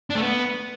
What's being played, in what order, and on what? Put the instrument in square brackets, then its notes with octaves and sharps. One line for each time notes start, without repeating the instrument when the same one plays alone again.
[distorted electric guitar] D4
A3
B3